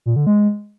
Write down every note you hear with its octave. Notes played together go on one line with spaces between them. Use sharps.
A#2
D3
G#3